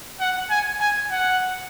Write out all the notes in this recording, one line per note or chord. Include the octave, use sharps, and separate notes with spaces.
F#5
G#5
G#5
F#5